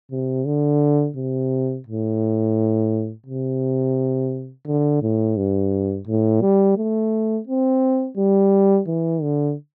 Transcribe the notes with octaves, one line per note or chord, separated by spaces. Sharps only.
C3
D3
C3
A2
C3
D3
A2
G2
A2
G3
A3
C4
G3
E3
D3